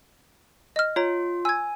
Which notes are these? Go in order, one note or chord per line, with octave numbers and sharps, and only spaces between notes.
D#5 F6
F4 C#5 A#5
G#5 E6 G#6